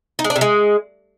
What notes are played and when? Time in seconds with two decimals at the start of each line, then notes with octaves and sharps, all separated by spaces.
0.19 D#4
0.24 G#3
0.30 D4
0.36 C3
0.41 G#3